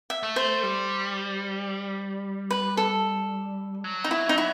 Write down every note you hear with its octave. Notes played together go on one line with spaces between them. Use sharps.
E5
A3
C5
G3
B4
A4
F#3
D#4
E4
D#4
E4